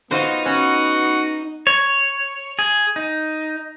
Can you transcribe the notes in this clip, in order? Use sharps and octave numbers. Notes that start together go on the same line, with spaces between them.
B3 D#4 F4 F#4 C5
C#4 F#4
C#5
G#4
D#4